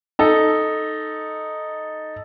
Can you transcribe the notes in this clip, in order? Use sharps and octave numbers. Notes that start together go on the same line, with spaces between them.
D#4 A4